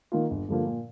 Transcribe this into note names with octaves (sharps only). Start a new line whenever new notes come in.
D#3 A#3 F4
G1
G2 D3 F3 A#3
A#2